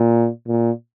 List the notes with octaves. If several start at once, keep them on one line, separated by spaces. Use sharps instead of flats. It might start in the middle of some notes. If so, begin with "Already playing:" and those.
Already playing: A#2
A#2